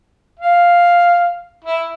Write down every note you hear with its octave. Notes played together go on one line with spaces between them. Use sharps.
F5
E4